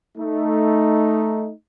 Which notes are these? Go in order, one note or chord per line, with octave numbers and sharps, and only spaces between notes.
A3 D#4